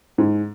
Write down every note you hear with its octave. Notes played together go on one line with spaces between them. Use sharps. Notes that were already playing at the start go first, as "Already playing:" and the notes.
G#2